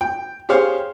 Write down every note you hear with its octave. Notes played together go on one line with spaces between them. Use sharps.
G5
G4 G#4 C5 C#5 F5